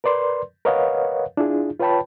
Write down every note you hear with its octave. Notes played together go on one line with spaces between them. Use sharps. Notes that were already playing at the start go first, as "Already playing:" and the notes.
A#4 B4 D5 C6
A#4 B4 C#5 D#5 F5 F#5
D4 E4 F4 G#4
F4 B4 C#5 G5 A5 B5